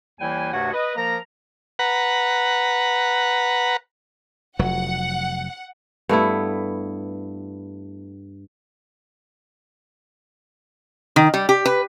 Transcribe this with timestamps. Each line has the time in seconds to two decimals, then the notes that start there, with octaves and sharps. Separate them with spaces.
0.20 D#2 E3 G3 E4 G5 G#5
0.53 D2 G2 C3 F#4 C#5 F#5
0.72 B4 D#5
0.96 F3 A#3 A#4 A#5
1.79 B4 F#5 A#5
4.59 F1 F#3 F#5
6.09 G2 A3 B3 E4
11.16 D#3
11.34 G3
11.49 G4
11.66 B4